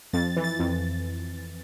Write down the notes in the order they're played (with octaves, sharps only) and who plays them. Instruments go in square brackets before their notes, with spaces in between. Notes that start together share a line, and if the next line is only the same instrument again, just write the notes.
[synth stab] F2 A6
E3
A6
F2